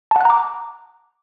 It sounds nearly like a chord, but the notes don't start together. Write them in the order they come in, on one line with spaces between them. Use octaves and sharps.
A5 F#5 F#6 A#5 D6